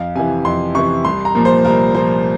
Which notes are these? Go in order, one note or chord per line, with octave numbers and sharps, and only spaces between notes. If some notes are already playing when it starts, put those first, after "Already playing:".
Already playing: F2 F5
C3 E3 G#5
F2 C6
C3 E3 C#6
C2 C6
A#5
A#2 F3 A#3
C5
C2 A#4
A#2 F3 A#3 C5